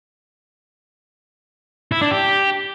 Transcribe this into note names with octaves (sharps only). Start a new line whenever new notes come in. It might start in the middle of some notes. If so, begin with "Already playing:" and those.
E4
D4
G4